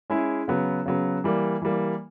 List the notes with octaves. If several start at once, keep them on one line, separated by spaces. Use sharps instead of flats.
G#3 C#4 E4 G#4
C#3 F#3 B3
C#3 F#3 B3
E3 G3 A#3
E3 G3 A#3